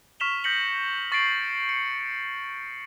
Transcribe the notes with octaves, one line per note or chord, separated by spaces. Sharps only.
C#6 F6 B6 E7 F7 G7
D#6 G6 A#6 B6 C#7 F#7
C#6 A6 A#6 C7 D7 F#7
C#7